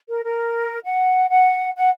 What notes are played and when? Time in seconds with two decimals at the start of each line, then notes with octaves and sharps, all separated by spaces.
0.09 A#4
0.24 A#4
0.85 F#5
1.30 F#5
1.76 F#5